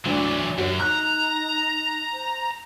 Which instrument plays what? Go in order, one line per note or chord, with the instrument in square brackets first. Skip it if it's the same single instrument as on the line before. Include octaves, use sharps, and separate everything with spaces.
[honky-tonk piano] D2 [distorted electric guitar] E3 F#3 [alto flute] D4
[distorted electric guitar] F#2 [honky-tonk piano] F#4 C#5
[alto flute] D#4 [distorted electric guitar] A#5 [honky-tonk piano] F#6
[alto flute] C5